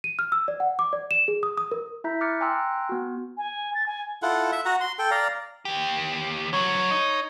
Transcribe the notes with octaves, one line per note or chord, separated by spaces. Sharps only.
D#7
F6
E6
D5
F#5
D6
D5
E7
G#4
D#6
D#6
A#4
E4 E5 A#5 G6 B6
D6 F6 F#6 A6 C#7
G5 G#5 A#5 C6 E6 F#6
B3 F#4
G#5
A6
G#5
E4 F4 A4 F#5
E5
F#4 F#5 A#5
C6
A4 G5
D5 F5 A#5
D#2 G4
D3 F#3 C#5
D#4